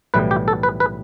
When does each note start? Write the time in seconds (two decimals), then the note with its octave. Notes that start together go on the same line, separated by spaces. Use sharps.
0.14 B1 A2 E3 G3 B4
0.31 G4
0.48 A4
0.63 B4
0.80 B4